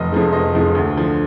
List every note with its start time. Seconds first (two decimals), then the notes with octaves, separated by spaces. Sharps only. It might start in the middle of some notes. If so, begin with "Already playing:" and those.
Already playing: F1 D#5
0.12 F2 F3 G#3
0.33 F1 D#5
0.55 F2 F3 G#3
0.75 D2
0.97 D3 F3